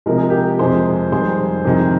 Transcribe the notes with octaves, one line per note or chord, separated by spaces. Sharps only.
C3 F3 G#3 A#4
G#4
G4 A#4
F2 C3 F3 G#3 G#4 C5
F2 D#3 G3 G#4 C5
F2 C3 D#3 G#3